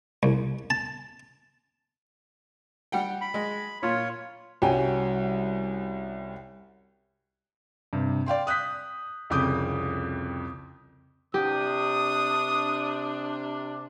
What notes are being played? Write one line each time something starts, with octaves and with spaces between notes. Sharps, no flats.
C2
A5
G3 F#5 G5
B5
G#3
A#2 F4 C#5
C2 G3 C#4 F#4 G5 G#5
G2 C3
D5 F5 G5 C6
D#6 F#6 G6 B6
C2 F2 C#3 D6 D#6 G6
C3 D4 G4 D#6